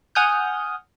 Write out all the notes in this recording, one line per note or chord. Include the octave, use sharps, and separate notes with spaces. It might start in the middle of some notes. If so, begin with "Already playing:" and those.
F#5 G#5 D#6 F6 G6